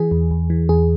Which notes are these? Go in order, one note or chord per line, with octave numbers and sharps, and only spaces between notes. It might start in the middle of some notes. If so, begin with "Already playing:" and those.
Already playing: E3 G#4
E2
E2
E3
E2 G#4